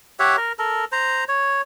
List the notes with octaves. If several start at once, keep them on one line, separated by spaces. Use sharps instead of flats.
G4 C#5 E5 F#5
A#4
A4 A#4
C5 A#5
C#5